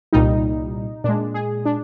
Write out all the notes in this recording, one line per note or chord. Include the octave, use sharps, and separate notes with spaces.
C2 A#2 G3 D#4
A#2 G#3 D4
G#4
D4